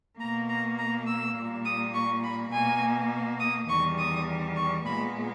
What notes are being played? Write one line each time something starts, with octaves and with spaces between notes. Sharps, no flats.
B2 A#3 A#5
A#5
A#5
E6
A#2 G3 A#3
D#6
C#6
B5
B2 A#3 G#5
D#6
E2 D#3 G3 C#6
D#6
C#6
A#2 G#3 B3 B5